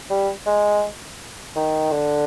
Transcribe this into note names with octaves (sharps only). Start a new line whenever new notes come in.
G3
G#3
D#3
D3